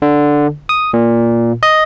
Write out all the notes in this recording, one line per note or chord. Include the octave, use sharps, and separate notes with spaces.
D3
D#6
A#2
D#5